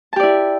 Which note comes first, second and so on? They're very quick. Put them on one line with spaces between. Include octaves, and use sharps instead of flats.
A5 G4 D5 E4